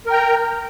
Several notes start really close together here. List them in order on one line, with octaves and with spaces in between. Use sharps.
A#4 G5 A#5